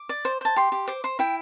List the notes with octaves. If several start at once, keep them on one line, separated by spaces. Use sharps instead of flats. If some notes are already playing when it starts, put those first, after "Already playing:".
Already playing: D6
D5
C5
C5 A5
G4 C6
G4
C5 D6
C5 C6
E4 G5